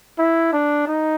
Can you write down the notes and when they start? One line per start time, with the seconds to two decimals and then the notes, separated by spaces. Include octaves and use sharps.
0.18 E4
0.53 D4
0.87 D#4